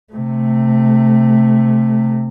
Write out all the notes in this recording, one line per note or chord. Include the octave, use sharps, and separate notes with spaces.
C3 A3